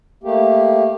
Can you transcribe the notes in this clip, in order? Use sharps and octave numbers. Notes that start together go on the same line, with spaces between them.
A3 A#3 G4